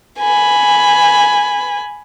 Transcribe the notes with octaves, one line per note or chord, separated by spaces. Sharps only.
G#5 B5